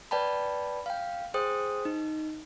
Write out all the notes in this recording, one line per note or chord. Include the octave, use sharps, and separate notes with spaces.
B4 D5 G5 A5 B5
F5 G5
G#4 C5 G5 D#6
D#4